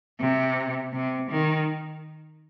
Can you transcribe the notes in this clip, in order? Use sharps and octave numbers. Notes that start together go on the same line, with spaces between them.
C3
C3
D#3